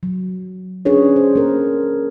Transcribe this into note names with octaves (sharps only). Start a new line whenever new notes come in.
F#3
C#4 D4 G#4 B4 C#5
C5
A#3 A#4